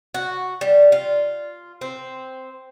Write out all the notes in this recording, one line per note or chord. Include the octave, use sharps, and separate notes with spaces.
F#4
G3
F4
C4